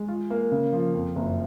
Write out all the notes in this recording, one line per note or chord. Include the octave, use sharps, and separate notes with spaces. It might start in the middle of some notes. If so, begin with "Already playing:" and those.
Already playing: G#3
F4
A#3
C#3
F3
F2
F#1